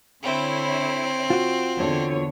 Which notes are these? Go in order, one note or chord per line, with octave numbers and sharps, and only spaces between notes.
D3 C4 E4 C#5
F4 F#4
E2 D3 C#5